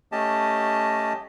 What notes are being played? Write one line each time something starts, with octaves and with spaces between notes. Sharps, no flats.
A3 C#4 G4 D#5 A5